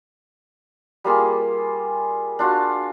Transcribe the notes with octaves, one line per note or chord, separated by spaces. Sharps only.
G3 A#3 F4 G#4
D4 F4 F#4